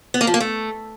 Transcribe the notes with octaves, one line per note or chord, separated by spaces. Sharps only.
B3
A#3
F3
A#3
A3